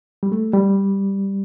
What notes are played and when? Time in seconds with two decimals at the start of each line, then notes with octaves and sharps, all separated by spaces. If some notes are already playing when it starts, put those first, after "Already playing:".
0.23 G3
0.32 A3
0.53 G3